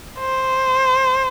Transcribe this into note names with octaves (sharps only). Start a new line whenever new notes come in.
C5